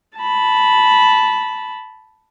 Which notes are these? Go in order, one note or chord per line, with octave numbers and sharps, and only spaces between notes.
A5 B5